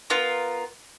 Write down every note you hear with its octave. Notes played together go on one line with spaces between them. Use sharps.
B3 F4 A#4